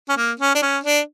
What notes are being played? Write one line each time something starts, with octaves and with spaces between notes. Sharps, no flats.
C#4
A#3
C#4
D4
C#4
D4